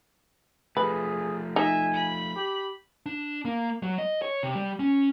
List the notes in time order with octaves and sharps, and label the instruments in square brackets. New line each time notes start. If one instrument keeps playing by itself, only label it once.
[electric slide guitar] F3 A3 [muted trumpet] G#4 [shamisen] B4
[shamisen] D#4 [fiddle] E5 [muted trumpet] G#5
[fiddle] B5
[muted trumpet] G4
[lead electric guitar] D4
A#3
F#3
D#5
C#5
C3
G3
C#4